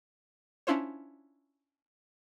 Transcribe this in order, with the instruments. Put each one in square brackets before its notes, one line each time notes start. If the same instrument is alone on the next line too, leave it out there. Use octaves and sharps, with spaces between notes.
[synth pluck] C#4 D4 E4 F4 C5 C#5